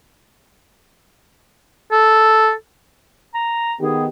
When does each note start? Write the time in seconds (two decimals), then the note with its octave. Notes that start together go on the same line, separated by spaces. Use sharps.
1.92 A4
3.34 A#5
3.80 D#3 B3 G4 G#4